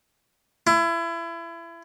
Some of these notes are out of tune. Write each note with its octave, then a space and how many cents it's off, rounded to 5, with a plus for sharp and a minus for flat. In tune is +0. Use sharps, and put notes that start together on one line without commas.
E4 +30